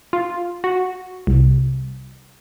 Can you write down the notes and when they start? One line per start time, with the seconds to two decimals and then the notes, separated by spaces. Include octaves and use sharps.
0.13 F4
0.64 F#4
1.27 C2